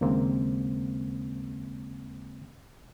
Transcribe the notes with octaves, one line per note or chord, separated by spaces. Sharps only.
D#2 C#3 G#3 A#3 C4